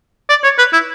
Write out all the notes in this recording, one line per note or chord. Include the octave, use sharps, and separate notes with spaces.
D5
C#5
B4
E4